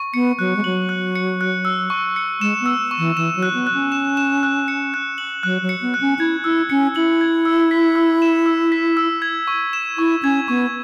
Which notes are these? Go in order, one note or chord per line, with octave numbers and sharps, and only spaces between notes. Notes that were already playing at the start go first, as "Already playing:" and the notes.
Already playing: C#6
B3 C#7
F#3 F#6
G#3
F#3 F#7
F#6
C#7
F#6
E6
C#6
C#7
G#3 E7
B3
E6
C#6
E3
E3 E7
F#3
F#6
B3
F#6
C#4
E7
E7
F#6
C#7
F#6
F#7
F#3 F#6
F#3
C#7
B3
F#6
C#4
E4 G#6
E4 E6
C#4 C#7
E4 F#7
G#6
E6
B6
E6
E7
E6
B6
E6
G#6
C#6
E7
E4 C#6
C#4 G#6
B3 C#6